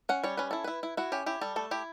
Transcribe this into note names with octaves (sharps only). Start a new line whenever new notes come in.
C#4 F#5
G3 C#5
C#4 B4
E4 A4
E4 B4
E4
E4 F#4
C#4 G4
E4 G4
G3 A4
A3 A4
E4 G4